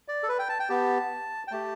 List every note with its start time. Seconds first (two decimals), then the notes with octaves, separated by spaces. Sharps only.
0.08 D5
0.23 A4
0.29 B4
0.39 G5
0.49 A5
0.60 G5
0.69 B3 G4 A5
1.48 G5
1.51 A3 G4 A5